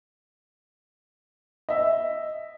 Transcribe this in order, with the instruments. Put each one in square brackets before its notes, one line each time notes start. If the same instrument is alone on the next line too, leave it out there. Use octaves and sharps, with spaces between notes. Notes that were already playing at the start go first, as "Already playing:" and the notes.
[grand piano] D#5 E5